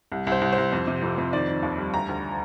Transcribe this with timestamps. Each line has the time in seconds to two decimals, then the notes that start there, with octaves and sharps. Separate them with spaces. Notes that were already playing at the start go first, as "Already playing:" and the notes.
0.12 C2
0.27 C2
0.32 C5
0.41 C2
0.53 C5
0.58 C2
0.72 F2
0.87 C3
1.03 F2
1.18 F2
1.33 D#3 D5
1.48 D#3
1.63 D#2
1.78 G3
1.94 D2 A#5
2.08 D2